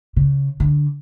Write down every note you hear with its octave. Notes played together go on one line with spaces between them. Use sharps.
C#3
D3